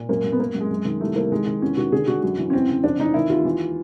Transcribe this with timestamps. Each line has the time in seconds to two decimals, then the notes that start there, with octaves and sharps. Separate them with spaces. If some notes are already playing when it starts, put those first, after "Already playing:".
Already playing: A#2
0.09 F#2 A#3
0.24 F#2
0.32 B3
0.40 F#2 A#3
0.54 F#2
0.61 G#3
0.70 F#2
0.85 D#3
1.01 C2 A3
1.16 C2 A#3
1.32 D#3 G#3
1.47 D#3
1.62 E2 C#4
1.77 D#3 F#4
1.92 D3 G#4
2.07 D3 F#4
2.23 F#2 F#4
2.38 E3
2.50 C#4
2.53 E2 C4
2.69 C#3
2.83 F2 D4
2.99 E3 D#4
3.14 D#3 E4
3.29 D#2 F4
3.45 E3